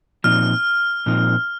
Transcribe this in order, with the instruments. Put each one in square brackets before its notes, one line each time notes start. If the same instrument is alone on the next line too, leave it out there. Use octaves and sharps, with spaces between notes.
[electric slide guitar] A#2 F3 C4 D#4 [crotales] F6
[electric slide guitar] A#2 F3 C4 D#4